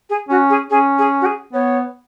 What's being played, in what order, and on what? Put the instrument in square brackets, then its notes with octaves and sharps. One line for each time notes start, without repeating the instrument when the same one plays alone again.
[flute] G#4
[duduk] C#4 [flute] F#4
[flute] G#4
[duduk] C#4 [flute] G#4
[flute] G#4
F#4
G#4
[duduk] B3 [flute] C#5